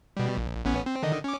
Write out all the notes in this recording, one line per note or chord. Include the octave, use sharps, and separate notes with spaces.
B2 G3
A#1
A1 B3 C#4
C4
D3 D#3 D#5
C#4 D6